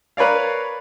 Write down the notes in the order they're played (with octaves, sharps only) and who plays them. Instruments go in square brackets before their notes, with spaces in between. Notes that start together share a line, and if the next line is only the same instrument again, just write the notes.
[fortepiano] A#4 B4 C#5 D5 F5